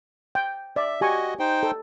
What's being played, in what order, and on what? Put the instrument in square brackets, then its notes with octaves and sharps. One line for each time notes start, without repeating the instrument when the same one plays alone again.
[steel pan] G5
[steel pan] D5 [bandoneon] E5
[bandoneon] F#4 D#5 [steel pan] G4 G#5 C#6
[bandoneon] D#4 C5 G5
[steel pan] A4